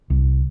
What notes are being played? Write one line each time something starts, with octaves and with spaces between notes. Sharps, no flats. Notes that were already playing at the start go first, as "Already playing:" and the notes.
C2